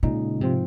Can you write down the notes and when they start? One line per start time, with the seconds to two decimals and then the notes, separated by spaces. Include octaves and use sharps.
0.03 A#2 C#3 G#3 D#4
0.40 G#2 C3 F3 C4 F4